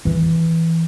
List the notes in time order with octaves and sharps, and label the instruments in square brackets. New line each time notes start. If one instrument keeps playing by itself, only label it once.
[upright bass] E3 D4